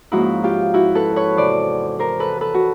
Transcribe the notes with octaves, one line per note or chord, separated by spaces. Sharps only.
G#2 F3 A#3 C#4 E4 F#4
F4 G4
E4 F#4
A4 B4
B4 C#5
E2 C3 E3 C5 D5
A#4 C5
A4 B4
A4 B4
F#4